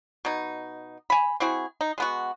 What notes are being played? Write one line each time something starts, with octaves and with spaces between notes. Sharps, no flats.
B2 D#4
G#5 B5
C4 E4 F#4 G#4
D#4
G#3 B3 F#4